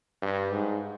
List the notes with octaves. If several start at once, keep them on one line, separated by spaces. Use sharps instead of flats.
G2
G#2